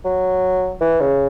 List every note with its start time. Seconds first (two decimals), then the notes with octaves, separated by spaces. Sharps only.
0.05 F#3
0.81 E3
1.00 C#3